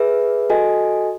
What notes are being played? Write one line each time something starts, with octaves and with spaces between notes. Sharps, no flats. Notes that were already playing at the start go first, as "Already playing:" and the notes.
Already playing: G#4 B4 E5
F#4 A4 D#5 G#5